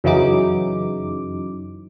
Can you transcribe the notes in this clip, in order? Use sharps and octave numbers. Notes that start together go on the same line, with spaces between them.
F#2 C#3 E3 F#3 D#4 D6